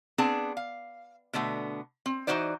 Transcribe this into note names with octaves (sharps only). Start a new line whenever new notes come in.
B3 C4 D4 G#4 A5
F5
B2 D3 A3 B3
C4
E3 A3 D#4 F#4 C5 D5